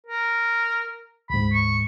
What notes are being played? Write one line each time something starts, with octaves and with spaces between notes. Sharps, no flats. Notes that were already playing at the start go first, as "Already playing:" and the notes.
A#4
D2 G#2 B5
C#6